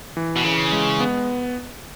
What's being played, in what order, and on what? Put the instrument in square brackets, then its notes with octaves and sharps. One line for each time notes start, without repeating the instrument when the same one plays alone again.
[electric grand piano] E3
[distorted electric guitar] B2
[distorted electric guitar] C#3 [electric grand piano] E3
[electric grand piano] G#3
B3